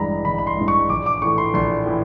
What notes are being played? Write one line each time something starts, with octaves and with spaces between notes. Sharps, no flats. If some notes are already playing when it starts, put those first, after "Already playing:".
Already playing: A1 G2 E3 G#3 A#5 B5
A1 B5
B5
C6
G2 E3 G#3
C#6
A#1 D6
D6
A2 E3 A3 C#6
C6
A#1 C6
A2 E3